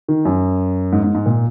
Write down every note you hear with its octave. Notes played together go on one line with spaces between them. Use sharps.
D#3
F#2
G#2
G#2
G#2
A#2